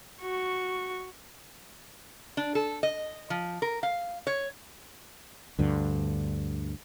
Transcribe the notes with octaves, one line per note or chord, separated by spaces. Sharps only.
F#4 C#6
D4
A4
D#5
F3
A#4
F5
C#5
D2 G2 D3